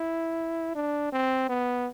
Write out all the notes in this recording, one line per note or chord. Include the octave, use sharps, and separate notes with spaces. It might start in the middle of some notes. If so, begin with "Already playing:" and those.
Already playing: E4
D4
C4
B3